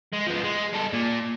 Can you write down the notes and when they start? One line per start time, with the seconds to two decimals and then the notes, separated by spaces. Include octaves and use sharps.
0.13 G#3
0.27 F3 B3
0.44 G#3
0.73 G3 A4
0.93 A#2